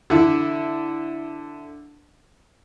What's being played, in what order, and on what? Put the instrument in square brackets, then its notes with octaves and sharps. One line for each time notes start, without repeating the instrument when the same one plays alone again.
[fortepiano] D3 E4